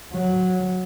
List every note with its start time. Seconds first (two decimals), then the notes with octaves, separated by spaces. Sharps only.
0.13 F#3